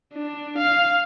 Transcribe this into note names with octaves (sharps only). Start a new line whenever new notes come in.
D4
F5